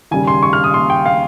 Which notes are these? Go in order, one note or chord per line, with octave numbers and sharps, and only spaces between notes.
D#2 C#3 G3 G#5
C6
C#6
F6
D#6
C6
G5
F5